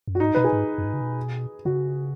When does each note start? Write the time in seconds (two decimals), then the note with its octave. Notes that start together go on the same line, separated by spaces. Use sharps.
0.08 F#2
0.15 F#4
0.20 G#2 D#4
0.35 B2 B4
0.44 G#4
0.53 G#2
0.78 F#2
0.85 G#2
0.94 C#3
1.01 B2
1.65 C#3 F#4